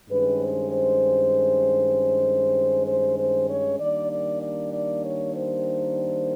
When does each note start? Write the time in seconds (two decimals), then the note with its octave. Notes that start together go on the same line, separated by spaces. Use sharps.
0.10 G2 D#3 G#3 C#4 B4
0.41 C5
0.72 C5
2.88 C5
3.18 C5
3.49 C#5
3.80 D#3 G3 A#3 D4 D5
4.11 D5
4.42 D5
4.73 D5
5.04 C#5
5.35 C5